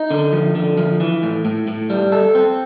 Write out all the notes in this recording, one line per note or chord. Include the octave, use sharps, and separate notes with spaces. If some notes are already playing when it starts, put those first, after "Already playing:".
Already playing: D#4
D3
F3
D3
F3
E3
A2
A2
A2
G3
A4
C4